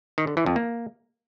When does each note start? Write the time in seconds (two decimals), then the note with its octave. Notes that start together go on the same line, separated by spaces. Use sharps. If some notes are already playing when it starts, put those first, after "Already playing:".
0.18 D#3
0.27 D3
0.37 E3
0.46 F2
0.56 A#3